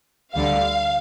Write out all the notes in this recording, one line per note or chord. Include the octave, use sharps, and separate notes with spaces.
D2 D3 G3 F5